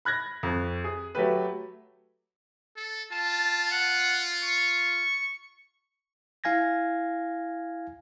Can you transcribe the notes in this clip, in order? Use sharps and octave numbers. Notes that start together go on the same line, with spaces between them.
B5 F#6 G#6 A#6
F2
G#4
F#3 A3 G4 B4
A4
F4 A5
F#5
C#6
E4 F5 G#5 G#6 A#6